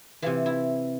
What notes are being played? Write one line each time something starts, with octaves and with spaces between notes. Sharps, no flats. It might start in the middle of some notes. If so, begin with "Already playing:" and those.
C3 E3 F4
E4